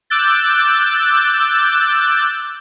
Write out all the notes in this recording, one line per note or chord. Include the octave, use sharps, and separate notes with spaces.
D6 E6 F#6 G6 A6